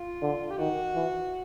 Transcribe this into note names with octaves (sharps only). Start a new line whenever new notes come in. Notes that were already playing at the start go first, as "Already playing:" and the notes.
Already playing: F4
D3
G4
D#3 F#4
E3